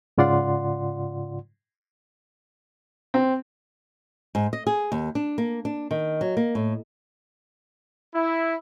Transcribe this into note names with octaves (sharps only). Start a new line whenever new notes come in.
G#2 C#3 F4 D5 F#5 C6
C4
G#2
D#5
G#4
D#2
D4
A#3
D4
D#3
F#3
A#3
A2
E4